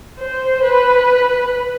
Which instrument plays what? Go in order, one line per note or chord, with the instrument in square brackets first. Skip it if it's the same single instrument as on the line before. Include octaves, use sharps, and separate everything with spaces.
[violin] C5
B4